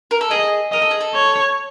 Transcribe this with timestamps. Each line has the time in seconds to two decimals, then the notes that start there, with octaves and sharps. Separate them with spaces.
0.11 A#4
0.21 A4
0.31 G#4 D#5
0.72 A#4 D#5
0.82 A4
0.91 G#4
1.01 A4
1.14 C#5